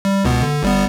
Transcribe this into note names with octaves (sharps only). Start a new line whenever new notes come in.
G3
C#2 B2 B3
D3
G1 G3 B3